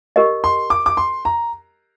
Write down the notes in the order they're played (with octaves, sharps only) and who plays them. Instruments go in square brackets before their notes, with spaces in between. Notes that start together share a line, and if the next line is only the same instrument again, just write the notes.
[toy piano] G4 A#4 D#5
[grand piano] C6
D6
D6
C6
A#5